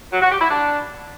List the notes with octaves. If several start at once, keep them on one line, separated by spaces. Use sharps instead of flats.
F#3
F#4
G4
E4
D4